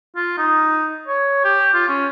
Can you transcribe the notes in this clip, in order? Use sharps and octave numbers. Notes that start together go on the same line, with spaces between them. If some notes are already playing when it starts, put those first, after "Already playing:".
F4
D#4
C#5
G4
F4
C#4